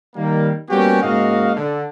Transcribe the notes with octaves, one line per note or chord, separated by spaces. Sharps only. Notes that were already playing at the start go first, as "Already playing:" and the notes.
D#3 G3 A#3
G3 A#3 B3 C#4 F#4 G4
G#2 C#3 A#3 F#4 D#5 F5
D3